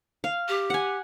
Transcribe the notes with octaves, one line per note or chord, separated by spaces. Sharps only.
F5
G4
F#5 G#5